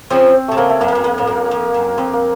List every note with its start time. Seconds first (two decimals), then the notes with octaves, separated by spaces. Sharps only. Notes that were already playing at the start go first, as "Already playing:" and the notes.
0.10 C#3 F3 C4
0.48 C3 A3
0.57 C#3 A#3
0.70 A3
0.81 F#2 A#3
0.88 F2
0.92 F#2 A#3
1.04 F2 A#3
1.18 A2
1.27 F#2
1.51 F2
1.74 F#2
1.98 F2 C4
2.13 A#3